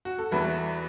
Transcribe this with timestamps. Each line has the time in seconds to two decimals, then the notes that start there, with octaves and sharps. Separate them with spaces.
0.05 F#4
0.18 A4
0.31 E2 E3 F#4 B4